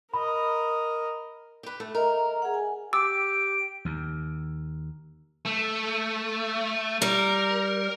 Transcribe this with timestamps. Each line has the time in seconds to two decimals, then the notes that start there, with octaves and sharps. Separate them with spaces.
0.14 A#4 D#5 B5
1.63 G4 B4
1.80 A3
1.95 A#4 D#5 E5 A#5
2.42 G#4 F#5
2.54 G#5
2.93 G4 D6 E6 D7
3.85 D#2
5.45 A3
7.02 G3 A#4